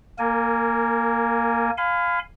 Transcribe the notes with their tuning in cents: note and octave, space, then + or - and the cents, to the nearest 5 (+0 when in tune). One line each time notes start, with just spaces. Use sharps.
A#3 +0 A#4 -30 G#5 +10
F5 +5 G#5 +0 B5 +40